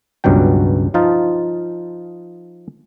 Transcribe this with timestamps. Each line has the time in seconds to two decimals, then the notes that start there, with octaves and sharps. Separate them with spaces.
0.24 C#2 G2 B2 F#3 G5
0.94 F3 D#4 F4 A5